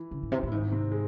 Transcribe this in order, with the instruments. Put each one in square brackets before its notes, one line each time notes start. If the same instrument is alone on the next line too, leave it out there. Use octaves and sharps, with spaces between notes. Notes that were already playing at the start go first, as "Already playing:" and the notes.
Already playing: [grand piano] E3 E4
[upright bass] C#3
A2
C3
A2
[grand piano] E4
[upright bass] G#2 [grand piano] D#3 D#4
[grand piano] C3 C4
G#3